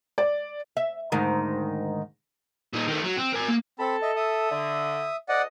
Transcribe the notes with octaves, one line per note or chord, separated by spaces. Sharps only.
D5
E5
D2 G#2 D#3
A#2 D#4
D#3 A3
F#3
C4
A#4 G#5
A#3
C4 A4 A5 B5
D#5 E5
E5 D#6
D3
D2 D5 D#5 F#5